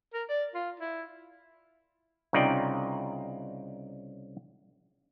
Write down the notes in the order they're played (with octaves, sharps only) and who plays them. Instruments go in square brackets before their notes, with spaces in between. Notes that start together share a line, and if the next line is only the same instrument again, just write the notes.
[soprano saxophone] A#4
D5
F4
E4
[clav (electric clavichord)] C2 C#3 D#4 F4 D5 G5